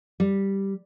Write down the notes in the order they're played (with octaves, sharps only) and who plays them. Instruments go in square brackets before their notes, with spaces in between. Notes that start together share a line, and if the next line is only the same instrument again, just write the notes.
[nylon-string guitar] G3